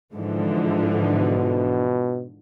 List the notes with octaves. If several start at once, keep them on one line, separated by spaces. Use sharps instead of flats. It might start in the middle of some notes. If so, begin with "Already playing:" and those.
G#2 D3 E3 F3
B2